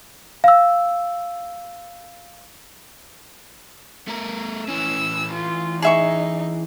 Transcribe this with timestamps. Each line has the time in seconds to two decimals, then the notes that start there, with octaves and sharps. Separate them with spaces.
0.44 F5 E6
4.08 A3 A#4
4.68 E3 C#4 E6
5.33 F4
5.82 D#4 G#4 E5 C#6